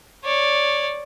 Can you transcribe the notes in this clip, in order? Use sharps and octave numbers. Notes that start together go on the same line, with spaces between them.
C#5 D5